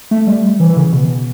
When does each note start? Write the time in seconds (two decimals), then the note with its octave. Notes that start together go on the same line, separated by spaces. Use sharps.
0.11 A3
0.27 G3
0.60 E3
0.76 C#3
0.92 B2